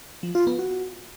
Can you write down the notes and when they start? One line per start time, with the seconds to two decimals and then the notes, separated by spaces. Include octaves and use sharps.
0.23 F3
0.35 F4
0.47 B3
0.59 F#4